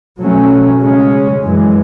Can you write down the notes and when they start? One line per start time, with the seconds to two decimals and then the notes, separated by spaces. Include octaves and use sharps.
0.18 B2 F#3 A3 C#4
0.80 C#3 G#3 C#4
1.41 F#2 E3 G#3